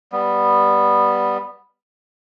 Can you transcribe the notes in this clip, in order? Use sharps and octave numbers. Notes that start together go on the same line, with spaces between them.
G3 B3